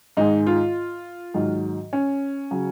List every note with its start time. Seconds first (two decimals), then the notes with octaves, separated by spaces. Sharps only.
0.17 G#2 D#3 G#3 D#4
0.47 F4
1.34 G#2 D#3 F#3
1.93 C#4
2.51 C#3 F#3